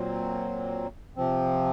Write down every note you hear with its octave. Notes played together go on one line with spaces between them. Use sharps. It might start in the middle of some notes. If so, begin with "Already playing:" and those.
Already playing: A#2 F#3 C4
C3 F3 C4